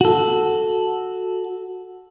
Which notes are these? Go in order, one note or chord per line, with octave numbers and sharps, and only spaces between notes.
F#4 A4